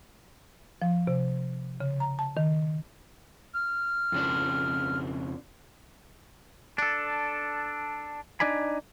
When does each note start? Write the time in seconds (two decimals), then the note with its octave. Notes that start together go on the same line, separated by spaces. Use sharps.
0.82 F3
1.07 C3
1.80 C#3
2.00 A#5
2.19 A5
2.37 D#3
3.53 F6
4.12 F2 C#3 D4
6.78 D4 A4
8.40 D4 D#4 D5 G#5 B5